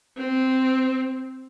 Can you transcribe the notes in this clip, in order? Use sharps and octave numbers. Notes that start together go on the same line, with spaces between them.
C4